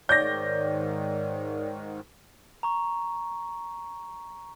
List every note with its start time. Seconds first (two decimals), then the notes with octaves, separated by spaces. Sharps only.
0.09 G#2 D#3 C#5 D5 G6 A#6
2.63 A#5 C#6